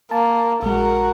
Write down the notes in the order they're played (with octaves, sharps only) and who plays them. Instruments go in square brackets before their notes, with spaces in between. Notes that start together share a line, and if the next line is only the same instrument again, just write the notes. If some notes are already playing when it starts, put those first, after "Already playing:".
[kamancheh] A#3 [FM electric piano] A5
[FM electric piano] A#1 G#3 [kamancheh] F#4 A#4